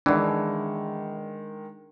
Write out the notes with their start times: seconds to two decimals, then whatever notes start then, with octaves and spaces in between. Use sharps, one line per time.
0.06 E2 D#3 E3 G#3 D4